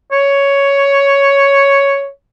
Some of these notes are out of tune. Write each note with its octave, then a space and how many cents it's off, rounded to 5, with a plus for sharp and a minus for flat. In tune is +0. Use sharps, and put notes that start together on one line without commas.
C#5 +5